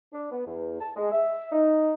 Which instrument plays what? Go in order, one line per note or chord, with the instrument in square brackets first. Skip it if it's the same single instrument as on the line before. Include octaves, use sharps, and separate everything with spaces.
[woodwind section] D4
B3
E2
A5
G#3
E5
D#4